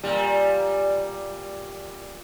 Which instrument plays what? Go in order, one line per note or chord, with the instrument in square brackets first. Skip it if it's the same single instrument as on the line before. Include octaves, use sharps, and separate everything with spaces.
[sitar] A#2 G3